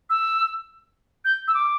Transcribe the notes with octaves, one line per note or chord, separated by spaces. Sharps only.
E6
G6
E6
D6